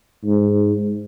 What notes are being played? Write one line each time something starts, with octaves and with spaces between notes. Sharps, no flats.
G#2